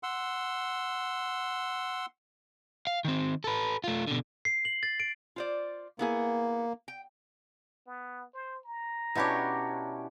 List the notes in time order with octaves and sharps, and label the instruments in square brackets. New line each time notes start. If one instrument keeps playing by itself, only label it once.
[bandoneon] F#5 C6 E6
[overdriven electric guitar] F5
D#3 C4
A4 B4
A3 F4
B2 D3
[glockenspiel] C7
F#7
A6
D7
[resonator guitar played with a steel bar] F4 C5 D5
[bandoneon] A#3 [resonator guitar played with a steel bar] B3 E4 G#4
[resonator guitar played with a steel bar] G5
[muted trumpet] B3
C5
A#5
[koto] B2 G4 C#5 [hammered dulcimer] C#4 D4 E4